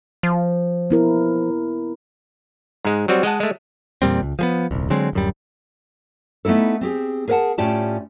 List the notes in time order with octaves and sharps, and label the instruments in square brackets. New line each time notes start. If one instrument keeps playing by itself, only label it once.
[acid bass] F3
[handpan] B3 E4 A#4
[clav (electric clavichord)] G#2 G#3
F#3 G3 C4 F#4
G#3 D#5 F#5 A5
G#3 A3
[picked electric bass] E2 A#2 G3 C4
C#2
F3 G#3 B3
D#1 C2
D3 F#3 G#3 C4
D1 F#2 G3
[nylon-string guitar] A3 B3 D#4 E4 A4
C4 G4 G#4
G#4 A#4 B4 E5 F#5 A5
A2 C#4 F4 G4 D5 A5